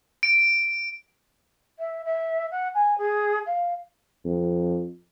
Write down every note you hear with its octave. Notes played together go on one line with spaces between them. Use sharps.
D7
E5
E5
F#5
G#5
G#4
F5
F2